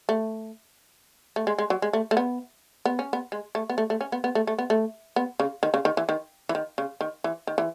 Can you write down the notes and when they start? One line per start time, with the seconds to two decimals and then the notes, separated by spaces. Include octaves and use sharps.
0.09 A3
1.36 A3
1.47 G#3
1.59 G#3
1.70 F#3
1.82 G#3
1.93 A3
2.11 A3
2.17 B3
2.85 B3
2.99 C#4
3.13 B3
3.32 G#3
3.55 A3
3.70 B3
3.78 A3
3.90 A3
4.01 C#4
4.12 B3
4.24 B3
4.35 A3
4.47 A3
4.58 B3
4.70 A3
5.16 B3
5.40 C#3
5.63 D#3
5.74 C#3
5.85 D#3
5.97 E3
6.09 D#3
6.49 E3
6.55 D#3
6.78 C#3
7.01 D#3
7.24 E3
7.47 D#3
7.58 E3